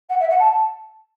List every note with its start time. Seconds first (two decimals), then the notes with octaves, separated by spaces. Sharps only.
0.09 F#5
0.19 E5
0.29 F#5
0.39 A5